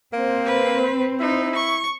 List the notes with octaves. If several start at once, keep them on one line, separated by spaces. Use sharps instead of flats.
A#3 C4 C5
B4
D#4 E4
C#6